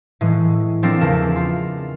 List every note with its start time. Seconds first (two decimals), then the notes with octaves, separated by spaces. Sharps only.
0.21 A2 E3 G#3
0.83 F3 C4 D4 A4 A#4
1.00 E2 C#3 A#4 A5 E7
1.36 F4